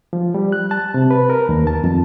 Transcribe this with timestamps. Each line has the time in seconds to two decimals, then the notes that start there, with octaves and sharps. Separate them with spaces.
0.13 F3
0.34 G3
0.52 F#6
0.71 A5
0.94 C3
1.11 B4
1.30 A#4
1.49 D#2
1.67 A5
1.84 F2